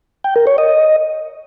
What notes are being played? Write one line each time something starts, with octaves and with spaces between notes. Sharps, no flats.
G5
A#4
C#5
D#5